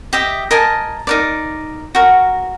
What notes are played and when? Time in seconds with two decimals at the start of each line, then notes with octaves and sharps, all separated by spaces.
0.13 G4 D#5 E5
0.51 A#4 D#5 G#5 A5
1.07 D#4 A#4 D5
1.95 F#4 A#4